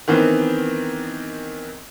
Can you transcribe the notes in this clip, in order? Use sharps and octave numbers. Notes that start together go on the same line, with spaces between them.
D#3 E3 B3 C4